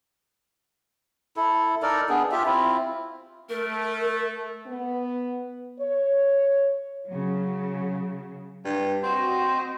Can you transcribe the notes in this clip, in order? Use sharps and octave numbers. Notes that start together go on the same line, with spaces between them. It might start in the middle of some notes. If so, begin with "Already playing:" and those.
E4 A4
D#4 A4 A#4 D5
B3 D4 G#4
F4 G4 E5
C4 E4 F4
A3 A#4
B3
C#5
C#3 F#3
G2
C4 F#4 D#5